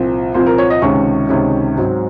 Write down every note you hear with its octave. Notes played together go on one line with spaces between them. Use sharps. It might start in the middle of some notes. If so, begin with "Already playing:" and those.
Already playing: C2 A#2 F3 C4
C2 A#2 F3 C4 C5
A#4
C#5
D#5
C#2 C3 D#3 G#3 C#4 C#6
C#2 C3 D#3 G#3 C#4
G#2 F#3 C4